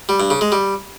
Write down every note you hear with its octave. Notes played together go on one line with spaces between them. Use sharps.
G3
G2
C#3
G#3
G3